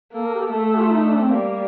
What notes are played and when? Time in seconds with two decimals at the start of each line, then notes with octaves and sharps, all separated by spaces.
0.13 A#3 A4
0.26 A#4
0.34 G4
0.39 A4
0.52 A3 A4
0.65 A4
0.78 F4
0.91 D#4
1.05 D4
1.17 C4
1.29 G3 A#3